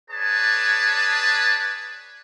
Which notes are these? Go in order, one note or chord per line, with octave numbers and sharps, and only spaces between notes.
G#4 B4 C#5 D5 G#5 A5